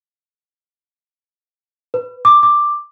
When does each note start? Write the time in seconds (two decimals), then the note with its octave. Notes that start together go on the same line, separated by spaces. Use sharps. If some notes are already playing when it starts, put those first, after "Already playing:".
1.94 B4
2.25 D6
2.43 D6